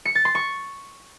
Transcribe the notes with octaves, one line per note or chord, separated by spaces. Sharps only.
C#7
A6
C6
C#6